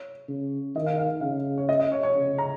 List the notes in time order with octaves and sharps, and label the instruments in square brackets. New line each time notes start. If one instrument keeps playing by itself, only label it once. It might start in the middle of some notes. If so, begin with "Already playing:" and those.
Already playing: [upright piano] C#5
[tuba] C#3
[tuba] D#3 [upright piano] D#5
[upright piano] F5
F5
[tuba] C#3 [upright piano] F5
[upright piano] C#5
D#5
D#5
C#5
C#5
[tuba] C#3
[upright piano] A#5